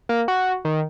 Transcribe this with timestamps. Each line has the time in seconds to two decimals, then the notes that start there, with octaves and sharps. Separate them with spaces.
0.09 A#3
0.28 F#4
0.65 D#3